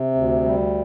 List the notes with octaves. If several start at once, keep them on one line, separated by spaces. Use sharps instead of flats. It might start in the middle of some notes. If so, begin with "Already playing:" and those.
Already playing: C3
D2
G3